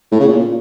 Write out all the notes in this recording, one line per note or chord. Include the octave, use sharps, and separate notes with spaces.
A2
C#3
A#2